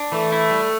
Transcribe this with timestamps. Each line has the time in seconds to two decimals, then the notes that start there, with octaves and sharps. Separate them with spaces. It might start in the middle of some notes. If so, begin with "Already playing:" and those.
Already playing: D4
0.12 E3 A3
0.32 E4
0.51 G3